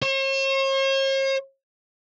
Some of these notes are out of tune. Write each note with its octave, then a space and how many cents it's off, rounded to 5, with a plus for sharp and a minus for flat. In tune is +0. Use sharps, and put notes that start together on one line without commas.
C#5 -45